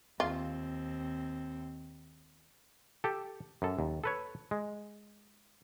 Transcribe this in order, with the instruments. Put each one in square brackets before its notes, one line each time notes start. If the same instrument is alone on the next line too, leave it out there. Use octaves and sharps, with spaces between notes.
[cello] D#2 C4 [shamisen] F4
[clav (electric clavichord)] G4 A4
F#2 A4
D#2
A4 B4 C#5
G#3